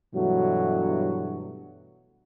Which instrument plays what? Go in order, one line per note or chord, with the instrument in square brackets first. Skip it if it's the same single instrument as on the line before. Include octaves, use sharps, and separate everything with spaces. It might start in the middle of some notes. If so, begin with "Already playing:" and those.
[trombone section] G2 B2 E3 F#3 A3 F#4